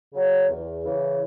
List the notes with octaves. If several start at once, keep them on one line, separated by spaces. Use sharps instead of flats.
C#3 F#3
E2
C#3 E3